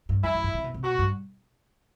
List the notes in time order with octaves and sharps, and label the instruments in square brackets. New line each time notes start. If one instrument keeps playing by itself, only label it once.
[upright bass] G2
[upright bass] F#2 [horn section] E4
[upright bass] F#2
G2
C3
B2
C3
[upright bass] B2 [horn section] F#4
[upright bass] G2